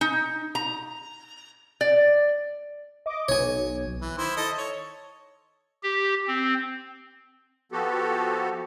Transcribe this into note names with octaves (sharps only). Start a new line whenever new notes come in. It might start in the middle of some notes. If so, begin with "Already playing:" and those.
D#4
A#5
D5
D#5 D6
B1 C#5 G#5
E3
D#3 E4 C5
A4 D#5
C#5
G4
C4
F3 B3 F#4 G4 A4